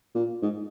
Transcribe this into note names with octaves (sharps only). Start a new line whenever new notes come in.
A#2
G#2